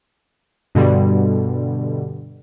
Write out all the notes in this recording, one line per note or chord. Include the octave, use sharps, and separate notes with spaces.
G2 B2 D3 G3